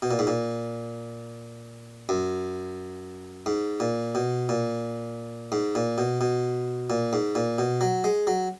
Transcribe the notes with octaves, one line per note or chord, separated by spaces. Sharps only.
B2
A#2
G#2
A#2
F#2
G#2
A#2
B2
A#2
G#2
A#2
B2
B2
A#2
G#2
A#2
B2
F#3
G#3
F#3